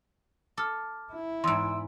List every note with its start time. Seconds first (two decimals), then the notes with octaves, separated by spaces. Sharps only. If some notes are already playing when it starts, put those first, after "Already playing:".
0.57 A4 D6 F6
1.13 E4
1.44 E2 G#2 C6 E6 D7